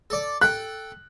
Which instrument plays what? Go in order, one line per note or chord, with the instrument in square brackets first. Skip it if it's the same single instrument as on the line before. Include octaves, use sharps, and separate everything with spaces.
[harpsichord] A4 D5
[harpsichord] A4 G5 [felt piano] F#6